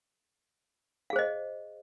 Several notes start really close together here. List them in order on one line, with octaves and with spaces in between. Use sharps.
F5 G#4 C5 D#5